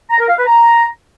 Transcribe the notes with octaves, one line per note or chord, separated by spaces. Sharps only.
A#5
A#4
F5
B4
A#5